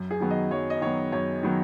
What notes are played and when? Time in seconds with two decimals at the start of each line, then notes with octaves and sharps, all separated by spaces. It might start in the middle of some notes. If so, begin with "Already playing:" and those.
Already playing: F#2
0.11 G#4
0.20 D#3 F#3 B3
0.30 D#5
0.50 F#2 C#5
0.70 D#5
0.81 D#3 F#3 B3 C#5
1.12 F#2 C#5
1.43 D#3 F#3 B3